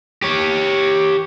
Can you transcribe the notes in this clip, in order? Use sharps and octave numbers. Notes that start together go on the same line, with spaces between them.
G4 C#5